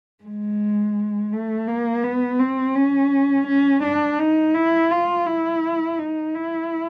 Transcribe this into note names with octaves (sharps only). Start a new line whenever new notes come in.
G#3
A3
A#3
B3
C4
C#4
C#4
D4
D#4
E4
F4
E4
D#4
E4